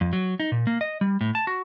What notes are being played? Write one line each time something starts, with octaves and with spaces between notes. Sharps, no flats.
F2
F#3
D#4
A#2
A#3
D#5
G3
A2
A5
F#4